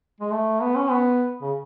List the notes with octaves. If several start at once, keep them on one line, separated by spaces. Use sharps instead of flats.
G#3
A3
B3
C#4
B3
C#3